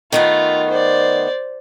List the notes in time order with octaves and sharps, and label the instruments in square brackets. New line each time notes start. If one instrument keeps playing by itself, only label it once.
[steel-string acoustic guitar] D#3 A3 B3 [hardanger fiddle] F4
[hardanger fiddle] C5 D5